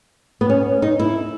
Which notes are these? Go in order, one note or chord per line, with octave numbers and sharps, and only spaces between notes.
B3
C#4
D#4
E4